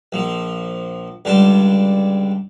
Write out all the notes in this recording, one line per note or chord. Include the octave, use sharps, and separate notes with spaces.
A#1 F3
C#2 D3 G3 G5 A5